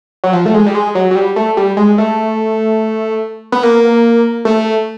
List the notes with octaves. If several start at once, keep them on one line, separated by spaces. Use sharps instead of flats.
F#3
F3
A3
G#3
G3
G#3
F#3
F#3
G3
A3
G3
G#3
A3
B3
A#3
A3